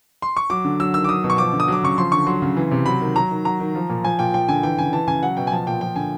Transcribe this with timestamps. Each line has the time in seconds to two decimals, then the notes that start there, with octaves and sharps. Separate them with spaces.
0.22 C6
0.37 C#6
0.50 F#3 D6
0.65 D3
0.80 F#3 E6
0.94 D#3 E6
1.04 D6
1.09 F#3 D#6
1.24 B2
1.30 C#6
1.38 F3 D6
1.53 D3
1.60 D#6
1.68 F#3 D6
1.83 C#3 C#6
1.98 F3 C6
2.12 D3 C#6
2.27 F#3 C6
2.42 C#3
2.57 E3
2.71 C3
2.86 F#3 B5
3.01 D#3
3.16 F#3 A#5
3.31 D#3
3.45 F#3 A#5
3.60 D#3
3.75 F3
3.90 A#2
4.04 F3 G#5
4.19 A#2 G5
4.34 F3 G5
4.49 D3 G#5
4.63 E3 G5
4.78 C#3 G#5
4.93 E3 A5
5.07 C#3 G#5
5.23 F#3 F#5
5.37 B2 G5
5.47 G#5
5.52 F3 A5
5.67 A#2 G5
5.81 F3 G5
5.96 D3 G#5